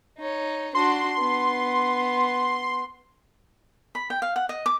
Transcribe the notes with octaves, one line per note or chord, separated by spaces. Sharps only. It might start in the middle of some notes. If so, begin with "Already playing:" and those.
D#4 C#5
D4 F#4 C6
B3
B5
G5
F5
F#5
D#5
D6